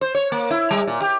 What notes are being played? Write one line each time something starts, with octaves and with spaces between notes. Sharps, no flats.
C5
C#5
A#3
E4
G3
A#2
G4